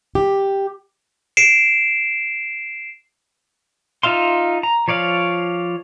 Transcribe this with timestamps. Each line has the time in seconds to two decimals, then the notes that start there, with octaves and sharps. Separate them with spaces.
0.15 G4
1.37 C7 D7 E7
4.03 D#4 F4 E5 F5 C6
4.63 A#5
4.88 F3 C#5 D5 F5